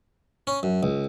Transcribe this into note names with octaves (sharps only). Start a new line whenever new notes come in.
C#4
F#2
C#2